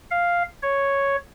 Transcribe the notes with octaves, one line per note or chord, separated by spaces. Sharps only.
F5
C#5